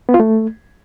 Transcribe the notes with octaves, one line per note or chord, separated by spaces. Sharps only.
B3
F4
A3